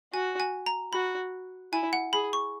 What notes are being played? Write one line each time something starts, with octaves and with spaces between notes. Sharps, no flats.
F#4 G#5
G#5
A#5
F#4 B5
E4 G#5
F#5
G#4 B5
C#6